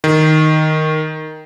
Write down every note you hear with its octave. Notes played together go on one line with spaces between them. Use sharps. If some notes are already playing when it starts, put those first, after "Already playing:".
D#3